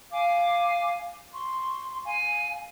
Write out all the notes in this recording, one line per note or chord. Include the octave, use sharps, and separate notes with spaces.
F5 G#5 D6
C6 C#6
F5 G#5